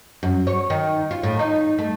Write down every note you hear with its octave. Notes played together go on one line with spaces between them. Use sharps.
F#2
C#5
D#3
F4
A2
D#4
A3